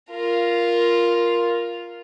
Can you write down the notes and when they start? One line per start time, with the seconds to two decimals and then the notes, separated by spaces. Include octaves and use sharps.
0.11 F4 A#4